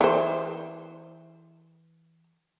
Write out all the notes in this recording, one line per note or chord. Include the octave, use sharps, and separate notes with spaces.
E3 C5